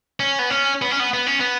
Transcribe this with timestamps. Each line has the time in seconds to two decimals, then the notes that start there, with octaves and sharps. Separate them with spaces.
0.20 C#4
0.39 B3
0.50 C#4
0.82 B3
0.91 C#4
1.00 B3
1.13 B3
1.27 C#4
1.40 B3